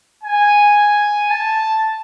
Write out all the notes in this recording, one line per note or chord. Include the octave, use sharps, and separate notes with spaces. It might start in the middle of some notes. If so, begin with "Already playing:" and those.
G#5
A5